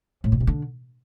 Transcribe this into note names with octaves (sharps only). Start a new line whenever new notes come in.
A2
B2
C3
D3